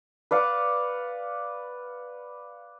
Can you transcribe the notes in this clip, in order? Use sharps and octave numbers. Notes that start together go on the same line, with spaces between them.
B4 D5 F5 F#5